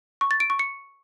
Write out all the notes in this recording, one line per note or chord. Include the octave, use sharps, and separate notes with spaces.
C#6
A6
D7
C#6
C#7